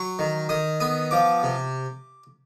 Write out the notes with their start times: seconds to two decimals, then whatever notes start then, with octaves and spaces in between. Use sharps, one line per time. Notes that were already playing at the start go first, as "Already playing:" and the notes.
Already playing: F#3 C#6
0.19 D#3
0.49 D#3 D#6
0.80 B3 D#6
1.11 F3 D6
1.43 C3